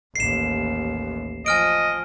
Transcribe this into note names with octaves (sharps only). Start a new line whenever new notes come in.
A1 D#2 C7 E7
F3 D#5 G#5 F6 D7